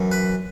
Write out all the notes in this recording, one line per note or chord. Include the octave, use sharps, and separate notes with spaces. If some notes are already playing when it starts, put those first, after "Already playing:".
Already playing: F#2 E3
B4